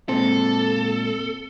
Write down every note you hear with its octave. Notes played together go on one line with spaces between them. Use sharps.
A#2 G#3 C4 A4